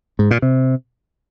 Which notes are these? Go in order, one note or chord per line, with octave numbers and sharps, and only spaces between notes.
G#2
A#2
C3